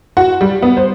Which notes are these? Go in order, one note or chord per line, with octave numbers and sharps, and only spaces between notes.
F#4
G3
B3
C5